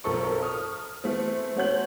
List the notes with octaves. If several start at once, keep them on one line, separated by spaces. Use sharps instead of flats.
B1 F3 C4 A4 A#4 C#6
D#6 F6
E3 A3 C4
A3 C#4 F#4 C5 G6 F#7